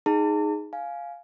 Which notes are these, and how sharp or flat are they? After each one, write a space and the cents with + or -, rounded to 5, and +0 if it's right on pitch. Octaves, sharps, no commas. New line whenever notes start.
D#4 +0 G#4 +0 A5 +40
F5 +0 G#5 +10